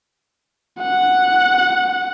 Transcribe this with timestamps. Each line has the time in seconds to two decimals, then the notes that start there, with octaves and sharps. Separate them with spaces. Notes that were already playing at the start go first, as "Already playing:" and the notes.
0.81 F#5